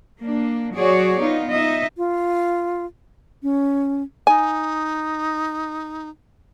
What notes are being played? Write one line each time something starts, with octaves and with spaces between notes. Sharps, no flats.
A#3 D4
F#3 F#4 G#4 C#5 D5
B3 D#4 F4
D#4 D#5 E5
F4
C#4
D#4 G#5